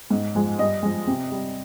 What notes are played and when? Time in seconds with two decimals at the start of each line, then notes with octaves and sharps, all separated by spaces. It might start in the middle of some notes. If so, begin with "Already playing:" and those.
0.10 G#2
0.35 F3 G#3
0.58 G2 D#5
0.83 F3 G#3
1.07 C3
1.32 G3